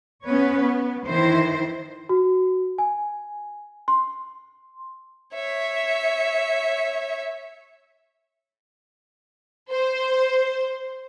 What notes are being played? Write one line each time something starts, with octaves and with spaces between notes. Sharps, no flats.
B3 C#4 B4 C#5
B3
D#3 E3 E4 C5
F#4
G#5
C6
C#5 E5
C5